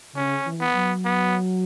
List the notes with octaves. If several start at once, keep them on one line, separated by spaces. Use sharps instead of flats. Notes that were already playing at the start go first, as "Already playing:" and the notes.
C#3 C#4
E3
B3
F#3
B3